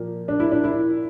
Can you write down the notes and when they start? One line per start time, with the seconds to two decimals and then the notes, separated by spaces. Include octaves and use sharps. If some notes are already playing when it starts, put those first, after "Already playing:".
Already playing: A#2 F3 A#3
0.28 D4
0.40 E4
0.52 D4
0.64 E4